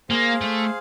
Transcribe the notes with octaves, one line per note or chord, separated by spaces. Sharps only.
A#3 G#4 C5 F5
A3